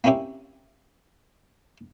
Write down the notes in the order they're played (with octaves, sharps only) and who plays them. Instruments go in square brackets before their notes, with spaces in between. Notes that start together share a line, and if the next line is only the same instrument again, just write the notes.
[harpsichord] A#3 C4 C#4 E4 G4